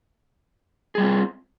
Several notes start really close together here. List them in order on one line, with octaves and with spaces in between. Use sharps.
G#4 G3 F4 C4